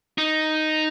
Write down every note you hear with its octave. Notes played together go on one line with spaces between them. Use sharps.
D#4